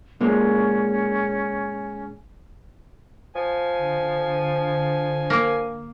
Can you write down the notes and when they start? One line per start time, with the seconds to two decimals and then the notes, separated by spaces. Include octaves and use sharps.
0.21 A#2 G#3 A#3 C#4
3.35 F3 G#5
3.78 D3
5.30 A#3